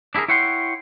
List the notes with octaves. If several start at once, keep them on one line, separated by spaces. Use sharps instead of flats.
D4 E4 G4 G#4 A#4
E4 C#5 F#5 G5 C6